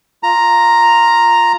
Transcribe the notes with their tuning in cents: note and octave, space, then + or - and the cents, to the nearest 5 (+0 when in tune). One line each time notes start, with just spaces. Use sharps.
F4 +0 A#5 +0